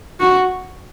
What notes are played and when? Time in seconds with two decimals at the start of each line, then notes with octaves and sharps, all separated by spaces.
0.20 F#4